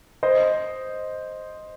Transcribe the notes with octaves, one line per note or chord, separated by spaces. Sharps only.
C5 D#5